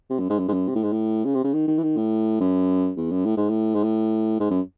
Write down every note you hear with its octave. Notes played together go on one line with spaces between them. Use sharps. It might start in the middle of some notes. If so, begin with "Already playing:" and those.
C3
F#2
G#2
F#2
G#2
F#2
C3
A2
G#2
A2
C#3
C3
C#3
D#3
D#3
E3
D#3
A2
F#2
E2
F#2
A2
G#2
A2
G#2
A2
G#2
F#2